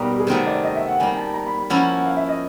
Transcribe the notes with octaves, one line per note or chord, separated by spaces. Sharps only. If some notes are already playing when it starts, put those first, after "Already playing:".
Already playing: B2 G3 A#3 D#4
G4
G#4
C3 D#3 F#3 A3 C4
D5
D#5
E5
F#5
D#3 G3 A#3 G#5
A5
A#5
B5
B5
F3 A#3 C#4 E4 F#5
F#5
F5
E5
D#5